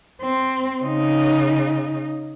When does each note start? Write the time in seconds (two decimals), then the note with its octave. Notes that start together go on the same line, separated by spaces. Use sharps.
0.21 C4
0.83 C#3 D#4